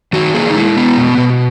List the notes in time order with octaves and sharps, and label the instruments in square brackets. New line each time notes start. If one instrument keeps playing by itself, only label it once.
[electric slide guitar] D#3 F#4
A#3 G#4
D#4
G#3 E4
B3
B2
B2